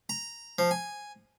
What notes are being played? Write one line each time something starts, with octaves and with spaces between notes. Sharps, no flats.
A#5
F3
G#5